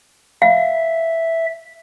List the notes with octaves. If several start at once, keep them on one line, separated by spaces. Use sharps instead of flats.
E5 F5